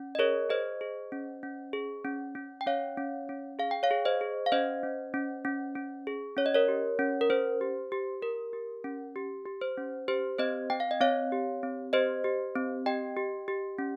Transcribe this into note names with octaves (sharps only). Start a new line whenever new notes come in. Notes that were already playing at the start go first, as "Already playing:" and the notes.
Already playing: C#4
D#5
G#4 A#4 C#5
G#4 C5 D#5
G#4
C#4
C#4
G#4
C#4
C#4
G5
C#4 C#5 F5
C#4
C#4
G#4 F5
G5
C#5 F5
G#4
C5 D#5
G#4
F5
C#4 C5 D#5
C#4
C#4
C#4
C#4
G#4
C#4 C#5
D#5
A#4 C#5
G4
C#4
A#4
C#4 C5
G4
G4
G4 A#4
G4
C#4
G4
G4
C5
C#4
G4 C5
C4 C5 D#5
C4 G5
F5
D#5
C4 C#5 F5
G4
C4
G4 C5 D#5
G4
C4
G4 D#5 G5
G4
G4
C#4